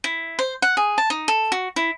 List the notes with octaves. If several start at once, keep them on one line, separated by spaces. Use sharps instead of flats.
E4
C5
F#5
G#4
A5
D#4
A4
F#4
E4